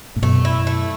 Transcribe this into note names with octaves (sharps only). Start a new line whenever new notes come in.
A2
F#2 B2 A3
E4
A3